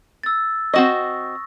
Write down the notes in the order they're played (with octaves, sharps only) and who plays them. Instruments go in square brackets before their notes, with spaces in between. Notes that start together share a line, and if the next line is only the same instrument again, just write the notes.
[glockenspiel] E6 A6
[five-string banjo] C4 F#4 D#5 [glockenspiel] C#6 D#6 A#6